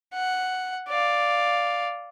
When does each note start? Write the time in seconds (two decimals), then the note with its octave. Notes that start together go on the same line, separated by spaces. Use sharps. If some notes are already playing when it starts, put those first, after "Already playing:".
0.14 F#5
0.88 D5 F5